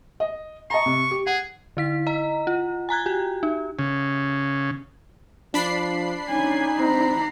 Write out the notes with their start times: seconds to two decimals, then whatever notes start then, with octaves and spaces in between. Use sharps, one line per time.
0.20 D#5
0.70 D#5 A5 A#5 C#6
0.86 C3
1.11 G4
1.27 G#4 F#5
1.77 D3 E4 B6
2.07 D#5 A#5
2.47 F4
2.89 G#5 A#5 F#6 G#6
3.06 F#4 G4
3.43 D#4
3.79 C#3
5.54 F3 D4 B5 C7
6.29 C#4 D#4 G#5
6.80 C4 A#5